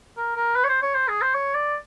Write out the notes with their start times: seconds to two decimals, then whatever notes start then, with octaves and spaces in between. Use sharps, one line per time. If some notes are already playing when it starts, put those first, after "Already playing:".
0.17 A#4
0.36 A#4
0.55 B4
0.64 C#5
0.69 C5
0.82 C#5
0.95 C5
1.08 G#4
1.21 C5
1.34 C#5
1.54 D5